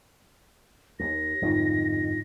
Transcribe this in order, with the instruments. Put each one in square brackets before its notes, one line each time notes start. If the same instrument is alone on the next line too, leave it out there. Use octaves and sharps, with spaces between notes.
[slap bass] D#2 [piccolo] A#6
[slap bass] G1 F2 D#3 [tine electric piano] G#2 D#4 F4